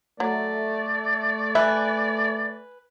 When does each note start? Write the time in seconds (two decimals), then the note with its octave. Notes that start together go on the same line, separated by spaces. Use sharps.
0.20 F#3 A3 D5
1.55 B4 E5 G#5